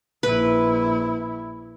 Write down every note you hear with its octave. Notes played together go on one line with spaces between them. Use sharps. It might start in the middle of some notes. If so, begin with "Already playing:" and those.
A#1 E4 B4